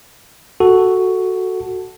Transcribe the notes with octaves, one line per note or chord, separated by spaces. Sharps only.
F#4 A4